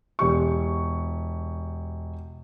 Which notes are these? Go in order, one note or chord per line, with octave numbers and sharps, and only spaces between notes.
E1 G4 C#6